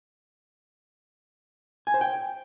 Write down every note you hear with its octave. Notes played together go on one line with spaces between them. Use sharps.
G#5
C5
G5